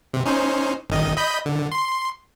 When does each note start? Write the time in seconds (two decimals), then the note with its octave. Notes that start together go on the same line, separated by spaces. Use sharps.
0.14 C3
0.26 C#4 D#4 C5
0.90 G#1 D#3 D#5
1.17 D#5 B5 G6
1.46 D3
1.72 C6